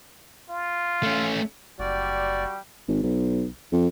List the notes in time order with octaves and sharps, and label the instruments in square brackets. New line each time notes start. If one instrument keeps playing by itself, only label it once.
[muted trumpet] F4
[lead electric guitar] A3 C#4
[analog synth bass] F#1 [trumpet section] G3 G5 [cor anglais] F#4 [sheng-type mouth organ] D5
[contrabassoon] G#1
B1
F2